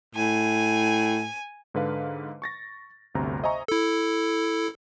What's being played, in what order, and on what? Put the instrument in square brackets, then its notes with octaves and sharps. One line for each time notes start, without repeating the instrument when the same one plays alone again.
[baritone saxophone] A2 [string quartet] G#5
[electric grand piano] G#2 D3 B4 F5
C#6 A6 A#6
G1 D2 C3 A#5
C5 D#5 E5 G#5 A#5 C#6
[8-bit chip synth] E4 A4